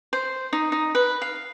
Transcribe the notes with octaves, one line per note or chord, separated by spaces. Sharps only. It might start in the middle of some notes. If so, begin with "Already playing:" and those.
C5
D#4
D#4
B4
F5